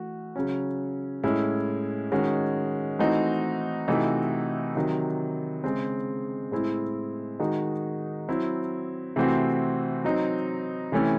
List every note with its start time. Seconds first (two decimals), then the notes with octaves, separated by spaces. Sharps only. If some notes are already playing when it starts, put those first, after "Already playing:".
Already playing: E3 A3 F#4
0.36 C#3 F#3 C#4
1.24 A2 G#3 C#4 E4
2.12 D#3 G#3 C#4 F#4
2.99 E3 A3 C4 D#4 F#4
3.88 C3 E3 A3 D#4 F#4
4.75 C3 D#3 F#3
5.64 C#3 G#3 C4
6.51 A2 G#3 C4 E4
7.40 D#3 G#3 D#4 F#4
8.28 F#3 C4 E4
9.16 C3 E3 A3 C4 F#4
10.04 F#3 C4 D#4
10.92 C3 E3 A3 C#4 E4